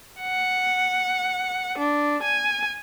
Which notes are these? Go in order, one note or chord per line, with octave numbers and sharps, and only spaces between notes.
F#5
D4
G#5